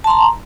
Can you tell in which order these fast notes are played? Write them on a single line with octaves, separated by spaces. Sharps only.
A5 C6 A#5